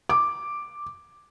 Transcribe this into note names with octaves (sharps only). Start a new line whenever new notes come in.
D6